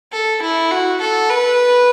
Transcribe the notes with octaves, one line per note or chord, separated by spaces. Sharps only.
A4
E4
F#4
A4
B4